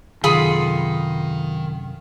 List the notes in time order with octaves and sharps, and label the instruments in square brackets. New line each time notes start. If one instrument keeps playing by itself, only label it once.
[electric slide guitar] F#2 C3 A4 [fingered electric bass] D#3 [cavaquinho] F4 G#4 B5